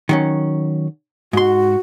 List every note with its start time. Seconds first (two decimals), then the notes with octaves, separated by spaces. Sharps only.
0.09 D#3 F#3 C#4
1.33 G#2 F#4 C6